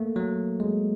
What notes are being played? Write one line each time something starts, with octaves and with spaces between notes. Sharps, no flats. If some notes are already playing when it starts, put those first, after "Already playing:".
Already playing: A3 A#3
F#3
G#3